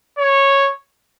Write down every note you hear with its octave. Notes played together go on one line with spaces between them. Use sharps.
C#5